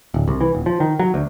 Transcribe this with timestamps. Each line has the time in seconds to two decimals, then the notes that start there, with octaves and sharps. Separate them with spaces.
0.14 D1
0.28 C2
0.41 E3
0.55 D#1
0.66 F3
0.80 D#3
0.99 F#3
1.14 D2